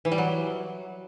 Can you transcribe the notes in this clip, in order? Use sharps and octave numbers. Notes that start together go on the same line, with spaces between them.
E3
G3
F#3